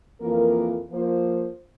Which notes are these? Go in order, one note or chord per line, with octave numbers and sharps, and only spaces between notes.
F2 E3 A#3 F4 A#4
F3 A#3 F4 C5